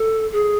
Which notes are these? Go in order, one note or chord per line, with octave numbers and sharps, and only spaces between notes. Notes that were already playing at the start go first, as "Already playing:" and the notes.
Already playing: A4
G#4